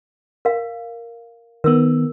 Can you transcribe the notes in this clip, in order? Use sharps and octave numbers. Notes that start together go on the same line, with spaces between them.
A#4 F5
D#3 B3 A#4 E6